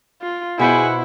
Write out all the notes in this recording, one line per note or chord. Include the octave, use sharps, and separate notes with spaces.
F4
B2 E4 G#4 B4 C5 F#5